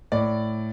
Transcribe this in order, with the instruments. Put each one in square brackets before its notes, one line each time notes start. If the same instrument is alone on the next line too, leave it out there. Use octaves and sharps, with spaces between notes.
[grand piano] A2 D5